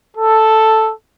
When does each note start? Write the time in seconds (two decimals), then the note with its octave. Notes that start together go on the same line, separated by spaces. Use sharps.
0.16 A4